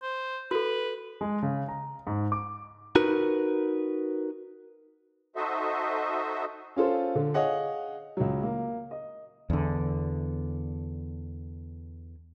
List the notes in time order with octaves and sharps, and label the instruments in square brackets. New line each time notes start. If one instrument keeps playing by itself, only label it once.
[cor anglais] C5
[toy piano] F#4 A4 [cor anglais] B4
[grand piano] G#3
C#3
A#5
G#2
D6
[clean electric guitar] D#4 F#4 A#4 B4
[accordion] D#4 F#4 A4 C5 D#5 E5
[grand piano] C#4 F4 A4 C5
D3
G#4 C#5 D#5 F5 F#5
C#2 F#3
A#3
D#5
[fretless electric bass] E2 D3